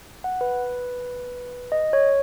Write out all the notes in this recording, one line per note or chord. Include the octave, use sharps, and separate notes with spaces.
F#5
B4
D#5
C#5